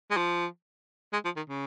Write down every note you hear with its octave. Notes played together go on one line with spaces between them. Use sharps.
G#3
F3
G#3
F3
D#3
C#3